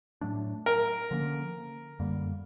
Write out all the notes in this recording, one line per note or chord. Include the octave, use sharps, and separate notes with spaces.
A2 F#3 A3 D4
A#4
D3 F3 A#3 C#4
F#2 D3 G3 A#3